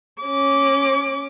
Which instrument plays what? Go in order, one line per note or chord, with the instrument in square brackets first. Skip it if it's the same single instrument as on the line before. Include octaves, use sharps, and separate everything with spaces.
[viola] C#4 D6